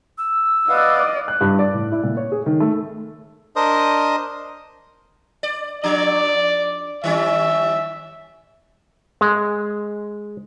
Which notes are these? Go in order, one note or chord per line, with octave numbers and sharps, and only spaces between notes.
E6
B4 D5 D#5 F5 F#5
F#6
G2
D5
A2
E4
A#2
C#5
G#4
D#3
A3
D4 A#4 C5 D#5 D#6
D5
F3 D4 D5
D#3 G3 C#4 E5
G#3